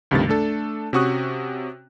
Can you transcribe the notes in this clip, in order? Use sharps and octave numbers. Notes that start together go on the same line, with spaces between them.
C#2 G2 C3 D#3 A3 A6
A3 D4 A4
C3 C#4 F#4 C#6 D#6 F#6